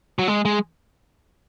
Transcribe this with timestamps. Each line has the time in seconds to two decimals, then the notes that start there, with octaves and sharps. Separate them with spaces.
0.19 F#3
0.28 G#3
0.45 G#3